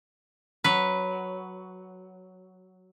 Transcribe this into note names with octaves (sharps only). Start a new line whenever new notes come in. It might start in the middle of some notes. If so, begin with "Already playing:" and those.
F#3 B4